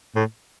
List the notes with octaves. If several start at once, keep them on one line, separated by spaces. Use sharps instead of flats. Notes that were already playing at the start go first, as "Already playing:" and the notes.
A2